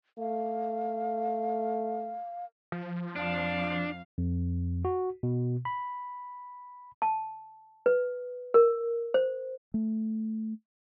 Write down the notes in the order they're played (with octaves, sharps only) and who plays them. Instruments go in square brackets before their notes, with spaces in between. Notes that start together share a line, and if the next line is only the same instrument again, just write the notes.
[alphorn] A3 [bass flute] F5
[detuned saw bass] F3
[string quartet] F2 F5 [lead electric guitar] D4
[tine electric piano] F2
F#4
B2
B5
[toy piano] A5
B4
A#4
C5
[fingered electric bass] A3